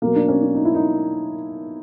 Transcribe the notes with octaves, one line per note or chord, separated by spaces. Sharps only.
B2 F#3 A#3
D4
C#4
D4
D#4
E4
D#4